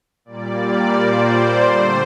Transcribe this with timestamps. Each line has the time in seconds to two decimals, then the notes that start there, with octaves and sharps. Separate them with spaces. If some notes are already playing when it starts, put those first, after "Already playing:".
0.25 A#2 G3 A#3 D5
0.93 C5
1.62 D3 A3 C5